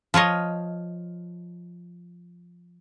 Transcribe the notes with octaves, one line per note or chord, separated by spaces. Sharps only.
F3 F4 C#5 D#5